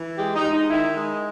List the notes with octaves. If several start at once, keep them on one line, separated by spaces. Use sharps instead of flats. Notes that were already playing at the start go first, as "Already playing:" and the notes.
Already playing: E3
G#3 G4
D#4
G#3
D#4
D#3 E4
G#3